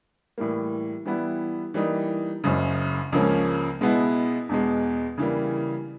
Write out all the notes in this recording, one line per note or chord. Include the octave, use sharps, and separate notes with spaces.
A2 E3 G3 A#3
E3 G3 B3 E4
E3 G3 A#3 D#4
F#1 F#2 C#3
C#2 C#3 F3 A#3 C#4
B2 G#3 B3 E4
E2 B2 G#3
C#3 E3 G3 A#3